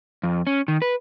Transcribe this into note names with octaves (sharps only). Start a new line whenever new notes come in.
F2
C#4
D#3
B4